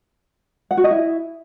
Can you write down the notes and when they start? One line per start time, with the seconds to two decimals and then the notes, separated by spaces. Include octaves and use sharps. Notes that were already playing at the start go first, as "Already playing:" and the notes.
0.71 F#5
0.77 F#4
0.84 D#5
0.91 E4